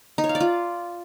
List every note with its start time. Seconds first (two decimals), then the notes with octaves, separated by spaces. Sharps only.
0.18 D#4
0.24 C#5
0.29 F5
0.35 D5
0.40 F4